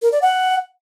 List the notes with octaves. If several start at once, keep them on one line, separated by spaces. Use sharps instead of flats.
A#4
D5
F#5